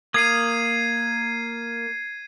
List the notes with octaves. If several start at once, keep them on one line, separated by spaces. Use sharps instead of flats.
A#3 D#6 G#6 C7 D#7